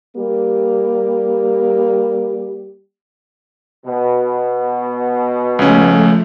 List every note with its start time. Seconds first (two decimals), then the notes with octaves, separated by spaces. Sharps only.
0.16 G3 A#3 G4
3.85 B2
5.59 C#2 F3 A3 C#4